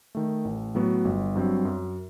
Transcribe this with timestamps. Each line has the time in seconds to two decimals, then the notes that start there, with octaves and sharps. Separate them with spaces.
0.15 D#3 A3
0.45 A1
0.75 A2 F#3 B3 F#4
1.05 G1
1.35 G2 F#3 C4
1.65 F#2